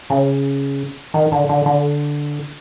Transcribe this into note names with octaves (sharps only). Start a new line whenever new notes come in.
C#3
D#3
D3
D3
D3